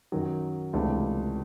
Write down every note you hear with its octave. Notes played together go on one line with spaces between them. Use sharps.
F#2 D#3 F#3
C#2 C3 E3 A3 D4